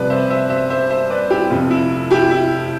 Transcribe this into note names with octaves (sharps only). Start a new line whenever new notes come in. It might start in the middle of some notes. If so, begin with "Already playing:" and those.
Already playing: C2 C3 F3 B4 D5
C5 E5
C5 E5
C5 E5
C5 E5
C5 E5
B4 D5
E4 G4
F1 F2 C3 F3 F4
E4
E4 G4
E4